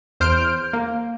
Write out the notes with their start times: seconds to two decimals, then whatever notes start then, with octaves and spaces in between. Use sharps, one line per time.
0.20 E2 C5 F6 G6 D7
0.73 A#3